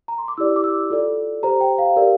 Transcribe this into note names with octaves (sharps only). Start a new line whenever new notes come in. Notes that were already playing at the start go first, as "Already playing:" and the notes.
A#5
C6
D6
E4 G4 D5 E6
D6
E6
F4 A4 D5
G4 C5 A#5
G5
F5
G4 A#4 D5